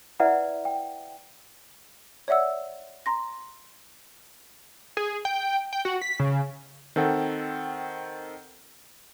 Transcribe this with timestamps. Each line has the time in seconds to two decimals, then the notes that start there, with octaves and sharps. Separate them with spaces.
0.20 E4 B4 D5 E5 F#5 A#5
0.65 G5
2.28 C#5 D5 E5 F#5 E6
3.06 A#5 C6 A#6
4.97 G#4
5.25 G5
5.73 G5
5.85 F#4
6.02 B6
6.20 C#3
6.96 D#3 C4 A4 F#5 G5